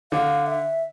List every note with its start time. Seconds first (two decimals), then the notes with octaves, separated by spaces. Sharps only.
0.12 D3 F5
0.46 E5